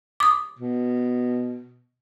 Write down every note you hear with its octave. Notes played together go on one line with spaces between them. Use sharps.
D6 D#6
B2